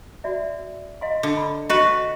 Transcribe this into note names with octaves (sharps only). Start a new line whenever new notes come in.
F#4 D5 E5
D#5 F5 C6
D3
B5
F#4 B4 D#5